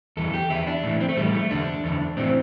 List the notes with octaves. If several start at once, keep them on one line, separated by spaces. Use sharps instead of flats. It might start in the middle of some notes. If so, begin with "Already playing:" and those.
E2 E3 A4
G4
E2 E3 E4
D4
A2 E3
C4
A3
A2 E3 G3
A3
E2 D3 D4
E2 D3
A2 E3 C4